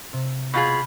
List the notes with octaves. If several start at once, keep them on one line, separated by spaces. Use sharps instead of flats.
C3
B2 F4 G#4 B5 F6 G6